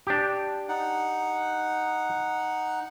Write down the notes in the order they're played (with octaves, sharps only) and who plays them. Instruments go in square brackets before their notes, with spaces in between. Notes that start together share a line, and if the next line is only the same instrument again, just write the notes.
[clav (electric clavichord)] D4 G4
[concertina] D#4 F#5